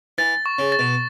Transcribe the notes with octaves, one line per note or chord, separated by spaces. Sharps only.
E3 A6
C#6
C#3
A6
B2